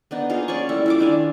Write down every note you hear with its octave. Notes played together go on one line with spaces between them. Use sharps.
B3 D4 D#4
A#3 D#4 F4 G#4
C#4 D5 G#5 C#6
G3 A3 E4
E4 F4 D6
D#3 D4 F5 G#5